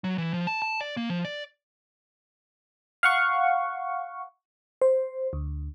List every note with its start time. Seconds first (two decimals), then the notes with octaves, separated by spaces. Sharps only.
0.04 F#3
0.18 E3
0.34 F3
0.47 A5
0.62 A5
0.81 D5
0.97 A#3
1.10 F3
1.25 D5
3.03 F5 F#5 C#6
4.82 C5
5.33 D2